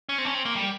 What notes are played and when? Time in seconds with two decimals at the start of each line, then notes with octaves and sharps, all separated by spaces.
0.09 C#4
0.18 C4
0.25 C#4
0.34 C4
0.45 A#3
0.56 G3